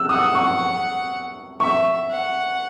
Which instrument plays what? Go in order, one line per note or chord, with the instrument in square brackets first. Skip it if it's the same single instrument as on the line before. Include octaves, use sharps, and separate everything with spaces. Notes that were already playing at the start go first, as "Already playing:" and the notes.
Already playing: [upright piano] E6 F#6
[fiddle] F#5 [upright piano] D#6
[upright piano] C#6
[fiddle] E5 [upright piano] C#6
[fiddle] F#5